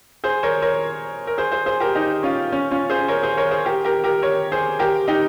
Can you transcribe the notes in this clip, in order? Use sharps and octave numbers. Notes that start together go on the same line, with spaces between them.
G#4 C5
A#4 C#5
A#4 C#5
A#4
G#4 C5
G#4 C5
G#4 C5
G4 A#4
D#4 G4
C#4 F4
C#4
C#4 F4
G#4 C5
A#4 C#5
G#4 C5
A#4 C#5
G#4 C5
G4 A#4
G4 A#4
G4 A#4
A#4 C#5
G#4 C5
G4 A#4
D#4 G4